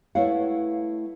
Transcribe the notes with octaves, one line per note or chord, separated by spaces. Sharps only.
A3 E4 B4 C#5 F5 F#5